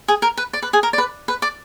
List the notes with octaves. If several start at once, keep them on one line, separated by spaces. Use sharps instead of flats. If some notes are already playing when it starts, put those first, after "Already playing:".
G#4
A#4
B4
D5
B4
G#4
A#4
D5
B4
B4
D5